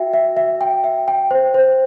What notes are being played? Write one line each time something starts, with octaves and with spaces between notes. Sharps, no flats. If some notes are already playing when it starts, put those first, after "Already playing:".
Already playing: F#4 E5 G5
E5
E5
G5
E5
G5
C5
C5